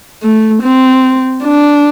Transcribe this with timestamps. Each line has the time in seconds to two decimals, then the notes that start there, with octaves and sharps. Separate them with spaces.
0.23 A3
0.63 C4
1.44 D4